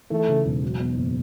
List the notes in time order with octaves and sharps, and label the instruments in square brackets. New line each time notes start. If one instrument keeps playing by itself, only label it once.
[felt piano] E3 [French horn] A3
[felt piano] C#3
E1
F#3
B2
F#1